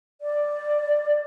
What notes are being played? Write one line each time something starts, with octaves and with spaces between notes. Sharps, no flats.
D5